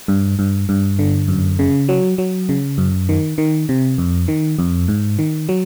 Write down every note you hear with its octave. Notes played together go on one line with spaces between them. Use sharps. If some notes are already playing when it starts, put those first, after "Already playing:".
G2
G2
G2
D3
F#2
C#3
F#3
F#3
C#3
F#2
D#3
D#3
C3
F2
D#3
F2
G#2
D#3
F#3